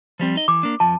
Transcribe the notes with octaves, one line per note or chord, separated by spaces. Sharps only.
F3 G3 C4
D#4 D#5
E3 D6
A#3 D4
F2 F3 A5